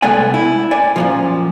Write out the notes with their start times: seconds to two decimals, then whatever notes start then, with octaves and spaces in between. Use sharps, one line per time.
0.02 C2 G#3 A3 B3 D5 G#5
0.34 E4
0.71 D5 G#5
0.96 F#2 A#2 F3